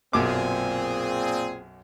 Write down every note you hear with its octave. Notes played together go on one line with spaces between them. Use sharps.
B1 F#2 A#2 C4 G#4 D6